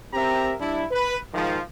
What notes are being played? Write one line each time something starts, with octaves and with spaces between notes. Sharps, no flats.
C4 G4 A#4 E5 A#5
G3 D4 E4
B4
G#2 D#3 F3